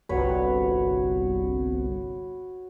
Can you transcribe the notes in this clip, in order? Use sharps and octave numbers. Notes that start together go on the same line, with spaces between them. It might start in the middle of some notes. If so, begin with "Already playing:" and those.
G1 C2 F#4 B4 C#5